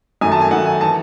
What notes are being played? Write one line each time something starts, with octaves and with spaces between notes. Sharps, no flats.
F#2 D#3 A3 G#5
A5
G#5
F#2 D#3 A3 F#5
G#5
A5
E3